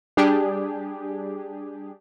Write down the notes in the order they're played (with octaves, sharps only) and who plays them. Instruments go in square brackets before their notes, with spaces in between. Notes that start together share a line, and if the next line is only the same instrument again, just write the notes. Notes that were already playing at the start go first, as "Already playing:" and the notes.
[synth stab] G3 D4 G4 G#4